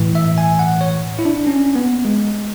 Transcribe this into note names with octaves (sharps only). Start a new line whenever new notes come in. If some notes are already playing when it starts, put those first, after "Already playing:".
Already playing: A2 E3
E5
G#5
F#5
C#5
E4
D4
C#4
B3
G#3